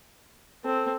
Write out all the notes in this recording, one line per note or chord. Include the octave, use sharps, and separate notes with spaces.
C4 A4